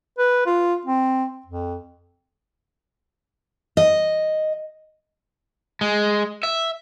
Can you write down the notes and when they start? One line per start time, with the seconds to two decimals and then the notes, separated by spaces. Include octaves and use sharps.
0.18 B4
0.46 F4
0.85 C4
1.46 F2
3.77 D#5
5.81 G#3
6.43 E5